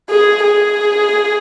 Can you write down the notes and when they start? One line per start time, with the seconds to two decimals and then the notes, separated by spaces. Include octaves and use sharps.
0.10 G#4
0.43 G#4